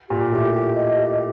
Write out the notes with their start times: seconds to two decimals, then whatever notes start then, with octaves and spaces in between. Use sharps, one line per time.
0.09 A#2 G4
0.31 A2 G4
0.53 G4
0.75 D#5
0.97 G4